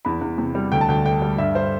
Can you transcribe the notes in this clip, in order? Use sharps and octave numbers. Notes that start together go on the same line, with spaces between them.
E2 B5
E2
C3
G3
D2 G5
A5
D2 G5
D3 G5
G3
G2 E5
C5